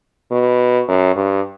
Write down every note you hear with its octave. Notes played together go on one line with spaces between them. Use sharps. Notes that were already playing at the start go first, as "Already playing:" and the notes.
B2
F#2
G2